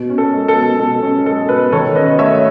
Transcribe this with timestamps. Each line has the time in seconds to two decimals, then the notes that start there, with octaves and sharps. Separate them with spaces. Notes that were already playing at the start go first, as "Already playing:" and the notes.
Already playing: B2
0.10 C#4
0.18 A4
0.33 G#3
0.48 A4
0.56 B2
0.79 B2 A4
1.02 C#4
1.25 G#3 A4
1.49 B2 B4
1.72 D#3 A4 C#5
1.95 C#4 B4 D#5
2.18 A3 C#5 E5